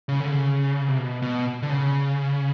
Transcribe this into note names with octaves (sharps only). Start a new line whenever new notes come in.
C#3
D3
C#3
C3
B2
B2
D3
C#3